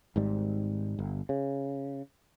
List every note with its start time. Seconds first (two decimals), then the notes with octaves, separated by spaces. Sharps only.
0.16 G#1 G#2 G3
0.99 G1
1.29 C#3